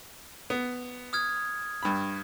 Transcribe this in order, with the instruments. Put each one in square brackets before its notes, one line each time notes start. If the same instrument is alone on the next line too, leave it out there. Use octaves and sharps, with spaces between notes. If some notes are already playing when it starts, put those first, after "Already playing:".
[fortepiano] B3
[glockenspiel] D#6 F6 G#6
[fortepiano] G2 B5